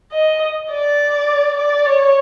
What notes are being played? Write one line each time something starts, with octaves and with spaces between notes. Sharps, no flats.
D#5
D5
D5
C#5